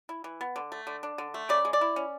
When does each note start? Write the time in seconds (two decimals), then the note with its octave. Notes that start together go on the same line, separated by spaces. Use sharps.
0.09 E4
0.24 E3
0.41 B3
0.56 D3
0.72 A3
0.87 D3
1.03 D4
1.18 D3
1.34 A3
1.49 C#3 D5
1.65 G#3
1.73 D5
1.81 E4
1.96 C#4